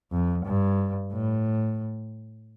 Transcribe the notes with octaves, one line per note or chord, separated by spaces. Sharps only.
F2
G2
A2